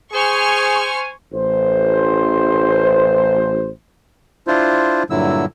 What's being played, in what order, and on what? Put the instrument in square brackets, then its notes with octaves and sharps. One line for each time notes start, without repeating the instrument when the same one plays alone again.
[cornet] G#4 [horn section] C5 G#5 [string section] C#6 F6
[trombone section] A1 C5
[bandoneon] D4 E4 F4 C5
G2 A#2 D3 F#3 E4 E6